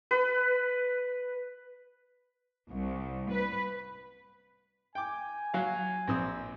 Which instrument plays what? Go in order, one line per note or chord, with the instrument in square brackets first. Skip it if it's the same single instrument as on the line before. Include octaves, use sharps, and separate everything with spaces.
[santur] B4
[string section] C2
B4
[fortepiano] G5 D6 [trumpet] G#5
[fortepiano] F#3 F5
A#1 C4 D#6